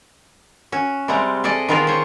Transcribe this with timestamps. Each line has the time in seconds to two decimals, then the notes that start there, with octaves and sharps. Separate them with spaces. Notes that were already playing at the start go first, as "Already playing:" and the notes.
0.72 C#4 F#4
1.08 C3 G3 G#3 F#5 A#5
1.44 G#4 A4 D5 D#5
1.69 D#3 B3 F4 G#4 A#4 B4
1.87 C5 C#5